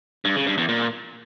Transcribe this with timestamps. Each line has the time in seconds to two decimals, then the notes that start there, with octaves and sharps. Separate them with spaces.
0.25 G2
0.36 C#3
0.47 G2
0.58 E2
0.69 A#2